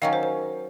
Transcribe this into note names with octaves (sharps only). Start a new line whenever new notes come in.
D#3 F#3 C#4 F5
C5
C5